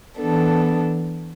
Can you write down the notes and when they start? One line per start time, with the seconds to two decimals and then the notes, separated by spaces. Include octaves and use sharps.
0.18 E3 B3 D4 A4